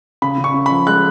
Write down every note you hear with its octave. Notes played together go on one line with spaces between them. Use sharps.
C#3 B5
C#3
C#6
C#3
B5
F3
G#3 F#6